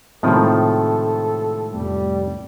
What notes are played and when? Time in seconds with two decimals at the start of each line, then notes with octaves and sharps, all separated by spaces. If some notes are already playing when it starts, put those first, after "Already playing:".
0.23 A2 C3 D#3 F3 G#3 A4
1.74 F1 G3